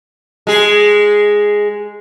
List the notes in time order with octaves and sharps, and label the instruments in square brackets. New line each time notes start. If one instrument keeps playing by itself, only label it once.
[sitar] G#3 G#4